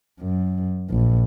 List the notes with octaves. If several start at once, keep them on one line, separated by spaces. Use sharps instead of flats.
F#2
A#1